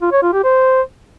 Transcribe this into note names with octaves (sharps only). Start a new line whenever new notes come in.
F4
C#5
F4
G4
C5